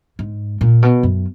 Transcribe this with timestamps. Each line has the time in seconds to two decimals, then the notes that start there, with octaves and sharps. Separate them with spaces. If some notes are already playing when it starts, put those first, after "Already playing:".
0.19 G#2
0.61 A#2
0.82 B2
1.03 F#2